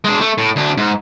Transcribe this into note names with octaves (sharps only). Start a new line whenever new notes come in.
G#3 D4
A3
A2
D2 D4
G#2